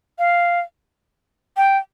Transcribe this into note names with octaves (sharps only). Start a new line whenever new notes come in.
F5
G5